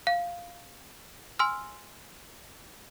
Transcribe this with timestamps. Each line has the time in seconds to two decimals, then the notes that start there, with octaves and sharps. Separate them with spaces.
0.07 F5
1.39 G#5 C6 E6 F6